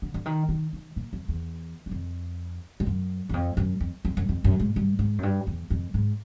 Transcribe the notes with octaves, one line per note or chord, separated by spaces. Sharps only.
D3
D3
D#3
D#3
D#3
A#2
F2
E2
E2
F2
G2
F#2
E2
F2
F#2
F2
F2
F#2
F2
F#2
G#2
G2
G#2
F#2
G2
E2
F2
G#2